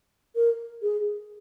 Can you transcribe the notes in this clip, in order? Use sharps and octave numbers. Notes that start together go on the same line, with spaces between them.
A#4
G#4